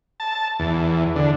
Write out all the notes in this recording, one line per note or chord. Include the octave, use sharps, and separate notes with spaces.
A5
E2
D3